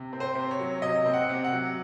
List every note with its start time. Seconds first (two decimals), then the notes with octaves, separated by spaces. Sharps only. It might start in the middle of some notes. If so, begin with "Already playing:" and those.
Already playing: C3
0.13 C4
0.20 C5
0.35 C3
0.51 C#5
0.59 F#3
0.82 C3 D#5
1.06 C4
1.14 F#5
1.29 C3
1.44 F#5
1.52 F#3